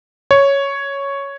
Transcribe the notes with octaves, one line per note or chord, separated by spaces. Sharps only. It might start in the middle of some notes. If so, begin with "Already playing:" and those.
C#5